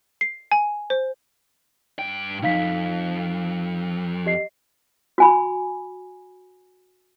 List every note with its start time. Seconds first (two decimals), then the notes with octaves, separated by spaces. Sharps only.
0.21 C7
0.52 G#5
0.90 C5
1.99 G2 G5
2.42 C2 F2 D#4 F5 B6
4.26 G4 D#5 C7
5.18 F#4 G#5 B5